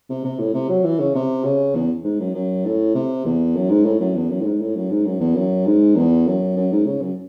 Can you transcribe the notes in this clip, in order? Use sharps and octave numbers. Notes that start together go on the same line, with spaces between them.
C3
C3
A2
C3
F#3
E3
C#3
C3
C#3
E2
G#2
F#2
F#2
A2
C3
E2
F#2
G#2
A2
F#2
E2
F#2
A2
G#2
A2
F#2
G#2
F#2
E2
F#2
G#2
E2
F#2
F#2
G#2
C#3
F#2